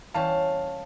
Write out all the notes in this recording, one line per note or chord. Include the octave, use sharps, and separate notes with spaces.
E3 G3 C#4 G4 F5 A5